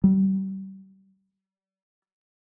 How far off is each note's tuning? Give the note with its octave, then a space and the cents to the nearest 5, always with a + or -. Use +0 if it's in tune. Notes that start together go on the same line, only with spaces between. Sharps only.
G3 -35